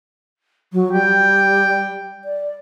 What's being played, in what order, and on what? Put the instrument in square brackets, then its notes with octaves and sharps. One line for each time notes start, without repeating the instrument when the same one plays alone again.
[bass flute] F#3
[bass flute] G3 [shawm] G5
[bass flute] D5